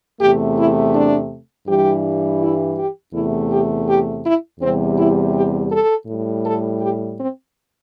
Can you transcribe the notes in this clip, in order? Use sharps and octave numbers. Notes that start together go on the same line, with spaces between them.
E2 C3 A3 G4
E4
D4
G2 E3 G3 G4
E4
G4
E2 C3 A3 E4
G4
G4
E4
E2 C3 G3 C4
E4
G4
A4
A2 G3
A4
G4
C4